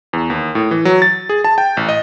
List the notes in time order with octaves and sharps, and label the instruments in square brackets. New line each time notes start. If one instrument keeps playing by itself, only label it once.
[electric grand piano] E2
D#2
A2
E3
F#3
A6
G#4
A5
G5
A1
D#5